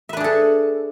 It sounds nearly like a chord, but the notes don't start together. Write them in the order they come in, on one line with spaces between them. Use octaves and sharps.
E5 B4 D4 G#4 A4